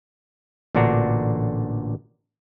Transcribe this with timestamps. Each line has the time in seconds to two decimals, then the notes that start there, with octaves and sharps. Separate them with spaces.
0.75 A1 A#2 D3 D4 F#4 A#5